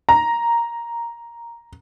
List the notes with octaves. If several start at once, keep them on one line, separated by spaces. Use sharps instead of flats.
A#5